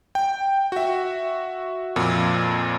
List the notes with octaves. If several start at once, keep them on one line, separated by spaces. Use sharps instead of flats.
G5
F#4 E5
F2 A#2